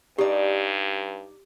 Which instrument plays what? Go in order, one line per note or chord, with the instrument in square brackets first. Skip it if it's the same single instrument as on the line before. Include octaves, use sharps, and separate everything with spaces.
[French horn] G2 [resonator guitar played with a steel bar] D#4 D5 [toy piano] G4